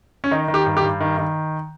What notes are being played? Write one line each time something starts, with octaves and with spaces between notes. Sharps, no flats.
C#4
D#3 D#4
D#3
G4
G2
G4
G2
D#3
D#3